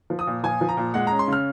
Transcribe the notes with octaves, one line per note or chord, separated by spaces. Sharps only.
F3
D#6
A#2
F3 G#5
F3
A#5
A#2
G#3 F#5
C#4 A#5
C6
C#3 F6